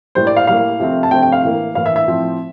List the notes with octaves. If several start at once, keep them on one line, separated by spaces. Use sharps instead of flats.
A2 G3 A#3 C5
D5
F5
A2 G3 A#3 F5
C3 F3 A3 C4
A5
C3 F3 A3 C4 G5
G5
F5
A2 E3 A#3
A2 E3 A#3 F5
E5
E5
A2 F3 C4